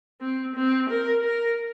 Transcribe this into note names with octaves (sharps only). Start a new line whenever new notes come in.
C4
C4
A#4
A#4